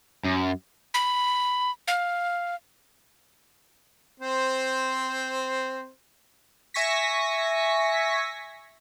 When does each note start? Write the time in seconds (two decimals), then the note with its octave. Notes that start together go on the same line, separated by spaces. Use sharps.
0.24 F#2
0.94 B5
1.88 F5
4.20 C4 C5
6.74 E5 G#5 C#6 A#6 B6